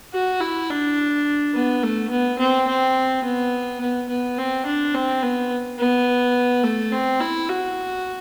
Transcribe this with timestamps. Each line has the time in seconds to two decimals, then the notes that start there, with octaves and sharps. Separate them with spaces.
0.13 F#4
0.40 E4
0.70 D4
1.54 B3
1.83 A3
2.10 B3
2.39 C4
2.67 C4
3.24 B3
3.80 B3
4.08 B3
4.38 C4
4.66 D4
4.94 C4
5.22 B3
5.79 B3
6.63 A3
6.92 C4
7.20 E4
7.49 F#4